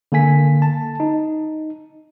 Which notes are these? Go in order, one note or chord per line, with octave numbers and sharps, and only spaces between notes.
D3 A#3 A4 G#5 B6
A5
D#4